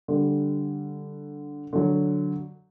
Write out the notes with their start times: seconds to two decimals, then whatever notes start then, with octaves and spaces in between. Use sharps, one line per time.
0.08 D3 G3
1.73 D3 F#3